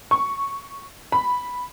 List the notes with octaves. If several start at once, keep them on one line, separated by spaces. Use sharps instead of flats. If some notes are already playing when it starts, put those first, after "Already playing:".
C#6
B5